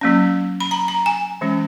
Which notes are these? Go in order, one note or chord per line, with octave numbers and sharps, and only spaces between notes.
F#3 A#3 C#4
B5
A#5
A#5
G#5
E3 G#3 C#4